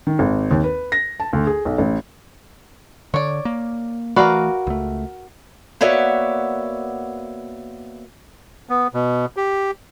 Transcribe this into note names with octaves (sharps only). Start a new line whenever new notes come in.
D#3
G#1
D#2
B4
A#6
A5
D2
G#4
B1
A1
D3 C#5 D5
A#3
E3 A3 F#4 A#4 B4 D5 F5
C#2 A3
A#3 B3 F#4 C#5 D5 E5
B3
B2
G4